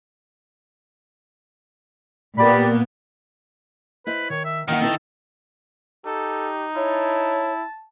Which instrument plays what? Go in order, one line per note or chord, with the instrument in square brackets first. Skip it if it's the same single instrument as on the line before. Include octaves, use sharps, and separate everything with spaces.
[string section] A#2 A#3 B3 [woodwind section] G4 D5 B5
[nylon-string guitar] E4 C5 D#5 [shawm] B4
[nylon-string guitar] D#3 [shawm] C#5
[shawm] E5
[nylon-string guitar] D#2 E3 F#5 [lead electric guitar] D#3 [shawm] F5
[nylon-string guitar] C4 E4 B4 [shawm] A4
[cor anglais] D#4 [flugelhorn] G4 [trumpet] A4
[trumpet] E4 [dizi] C#5 [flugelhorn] A5